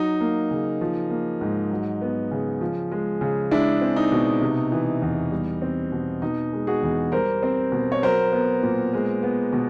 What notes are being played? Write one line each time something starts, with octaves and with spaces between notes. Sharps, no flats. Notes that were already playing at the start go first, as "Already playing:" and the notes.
Already playing: F#3 D#4
A#3
C#3
F3
A#3
G#2
F#3
B3
C#3
F3
G#3
C#3
G#3 D4 E4
C4
D#4
B2
C3
E3
E2
G3
C4
B2
B2 D#4
G#3
F#4 G#4
E2
G3 A#4 C5
C4
B2
C#5
F#3 A#4 C5
B3
A#2
G#3
B3
B2